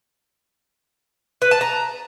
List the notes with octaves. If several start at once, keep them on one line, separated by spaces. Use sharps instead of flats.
B4
A5
A#5